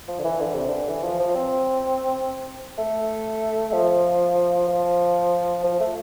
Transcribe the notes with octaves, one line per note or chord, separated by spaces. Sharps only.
F3
D3
E3
D3
C3
D3
E3
F3
F3
C4
A3
F3
F3
F3
A3